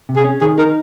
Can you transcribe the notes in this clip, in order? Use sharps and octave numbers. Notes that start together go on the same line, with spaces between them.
C3
G#4
C#4
D#3 G#4
D#4 A#4